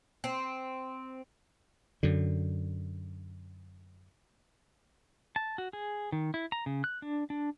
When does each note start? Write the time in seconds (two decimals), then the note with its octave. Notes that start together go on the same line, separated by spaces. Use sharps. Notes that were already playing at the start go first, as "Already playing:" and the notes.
0.24 C4
2.03 F#2 D3
5.36 A5
5.58 F#4
5.73 G#4
6.12 D#3
6.34 E4
6.52 A#5
6.66 C#3
6.84 F#6
7.02 D4
7.30 D4